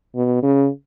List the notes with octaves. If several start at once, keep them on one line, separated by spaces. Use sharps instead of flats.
B2
C#3